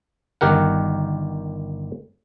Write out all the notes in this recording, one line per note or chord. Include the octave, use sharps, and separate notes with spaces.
G1 D#3 G4 A#4 F#5